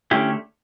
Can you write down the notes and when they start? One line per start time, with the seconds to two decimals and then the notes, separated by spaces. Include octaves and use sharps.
0.11 D3 A3 C#4 E4 G4